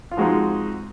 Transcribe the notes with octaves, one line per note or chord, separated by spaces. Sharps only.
F4
F3 G#3 C4 D#4 F#4